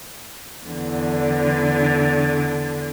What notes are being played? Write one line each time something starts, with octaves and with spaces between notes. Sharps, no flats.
E2 D3